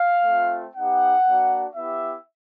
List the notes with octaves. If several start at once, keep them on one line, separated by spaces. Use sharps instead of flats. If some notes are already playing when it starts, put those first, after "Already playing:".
Already playing: F5
A3 C4 F4
B3 D#4 G4 F#5
A#3 D4 F#4
B3 E4 G4 E5